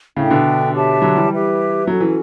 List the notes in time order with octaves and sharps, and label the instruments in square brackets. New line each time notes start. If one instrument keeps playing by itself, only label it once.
[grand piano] A2 C#3 [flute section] D4 A4 E5 G5
[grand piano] B2 D3
[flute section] G4 C#5 E5 A5
[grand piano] D3 F#3
E3 G3
[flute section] E4 G4 B4 E5
[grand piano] F#3 [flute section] C#4 F#4 A4
[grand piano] E3